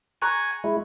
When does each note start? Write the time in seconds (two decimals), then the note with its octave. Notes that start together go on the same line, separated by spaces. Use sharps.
0.22 G#5 A#5 C#6 F#6
0.64 G#3 E4